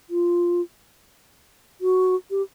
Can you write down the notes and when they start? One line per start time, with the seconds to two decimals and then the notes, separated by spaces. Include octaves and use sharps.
0.10 F4
1.81 F#4
2.30 G4